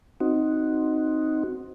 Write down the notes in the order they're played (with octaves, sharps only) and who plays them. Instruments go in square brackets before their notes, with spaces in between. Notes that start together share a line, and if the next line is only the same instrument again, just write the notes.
[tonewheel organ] C4 D#4 F#4